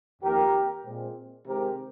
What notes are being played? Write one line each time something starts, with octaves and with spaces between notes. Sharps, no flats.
F2 D#3 A#3 G4 A#4
A#2 G#3 C4
C3 D#3 G#3 C4 G4 A#4